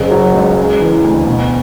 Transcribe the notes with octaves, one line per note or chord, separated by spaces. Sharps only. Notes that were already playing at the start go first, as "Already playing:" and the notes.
Already playing: F#1 C#3
F#3
C#2
C#3
E3
D2
B2